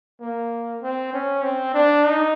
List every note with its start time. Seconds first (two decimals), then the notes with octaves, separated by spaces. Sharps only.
0.21 A#3
0.82 C4
1.13 C#4
1.42 C4
1.74 D4
2.04 D#4